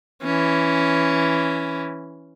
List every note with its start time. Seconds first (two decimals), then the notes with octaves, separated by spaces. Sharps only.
0.23 E3 C#4